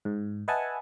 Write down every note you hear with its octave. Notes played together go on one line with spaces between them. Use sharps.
G#2
B4 D#5 E5 F#5 G#5 A5